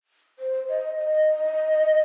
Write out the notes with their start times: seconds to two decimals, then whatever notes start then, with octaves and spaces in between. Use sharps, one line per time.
0.39 C5
0.69 D#5
0.99 D#5